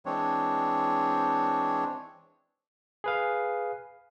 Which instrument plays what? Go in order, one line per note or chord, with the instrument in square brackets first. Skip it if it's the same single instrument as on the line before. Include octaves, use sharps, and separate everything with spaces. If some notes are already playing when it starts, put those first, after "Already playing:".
[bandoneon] E3 G#3 C4 D4 C#5
[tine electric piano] G#4 B4 F5